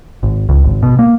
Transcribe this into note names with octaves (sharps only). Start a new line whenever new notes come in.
G#1
C#2
G#1
B2
A#3